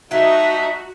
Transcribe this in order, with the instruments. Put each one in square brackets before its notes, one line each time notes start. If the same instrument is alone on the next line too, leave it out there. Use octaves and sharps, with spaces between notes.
[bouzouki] F#3 A3 [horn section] D#4 [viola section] F#4 [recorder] E5